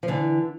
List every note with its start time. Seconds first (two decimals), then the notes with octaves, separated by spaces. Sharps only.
0.03 F3
0.08 D3 E3